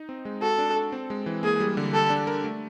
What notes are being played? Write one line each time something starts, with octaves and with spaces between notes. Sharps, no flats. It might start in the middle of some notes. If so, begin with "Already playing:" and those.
Already playing: D#4
C4
G#3
F#4 A4
D4
A4
C4
G#3
E3
A#3 G#4
G3
D3
G4 A4
D4
A#4
A3